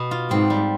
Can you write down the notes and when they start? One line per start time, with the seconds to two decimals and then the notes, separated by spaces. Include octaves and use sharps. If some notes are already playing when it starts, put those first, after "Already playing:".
Already playing: B2
0.11 F4
0.30 G#2 C4
0.50 G3